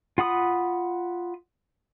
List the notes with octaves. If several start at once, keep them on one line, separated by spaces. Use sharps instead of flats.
F4 F#5 B5 D#6